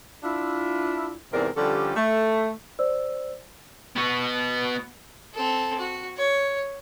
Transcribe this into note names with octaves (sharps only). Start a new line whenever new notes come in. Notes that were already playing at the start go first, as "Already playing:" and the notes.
D4 E4 F4
E2 G#2 C3 C4 A#4 D5
D3 F3 G3 C#4 G4 A4
A3
C5 D5 E6
B3 F#4
C4 A4
F#4
C#5